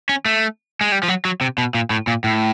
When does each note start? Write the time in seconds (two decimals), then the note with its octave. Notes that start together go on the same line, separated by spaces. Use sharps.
0.09 C#4
0.26 A3
0.81 G#3
0.92 G3
1.03 F3
1.08 F#3
1.25 F#3
1.41 C3
1.58 B2
1.75 A#2
1.90 A2
2.07 A#2
2.24 A2